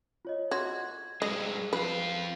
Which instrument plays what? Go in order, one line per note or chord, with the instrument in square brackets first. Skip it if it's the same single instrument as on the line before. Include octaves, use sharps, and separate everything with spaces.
[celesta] F4 C#5 D#5
[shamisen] F#4 [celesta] F#5 C6 G#6
[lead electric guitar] G2 G#3 [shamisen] D#5
[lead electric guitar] F2 F4 [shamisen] B4